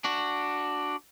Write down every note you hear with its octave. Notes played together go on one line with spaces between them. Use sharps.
D4 F#4